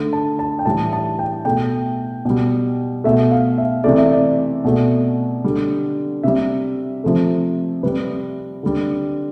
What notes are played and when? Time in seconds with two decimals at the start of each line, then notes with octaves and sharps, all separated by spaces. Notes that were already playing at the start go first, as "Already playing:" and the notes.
Already playing: D3 A3
0.13 A5
0.39 A5
0.59 G5
0.65 A2 E3 G3 A5
0.93 A5
1.19 G5
1.45 B2 A3 G5
2.25 B2 G3
3.04 B2 A3 E5
3.31 F5
3.58 E5
3.84 C3 E3 A3 D5
3.98 E5
4.13 D5
4.64 B2 A3
5.44 D3 G3
6.23 C3 G3 E5
7.04 C3 F3 A3
7.83 C3 G3 B4
8.63 D3 G3